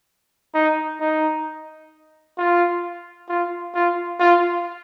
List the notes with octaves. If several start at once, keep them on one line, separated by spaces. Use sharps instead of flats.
D#4
D#4
F4
F4
F4
F4